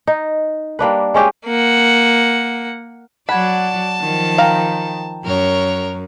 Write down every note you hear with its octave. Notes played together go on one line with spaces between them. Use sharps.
D#4
G3 A#3 D4 B4
G#3 C#4 G4 G#4
A#3 F#5
F#3 D5 F#5 A5 B5 G#6
D#3 F3
F5 G5 A#5
F#2 A#4 C#5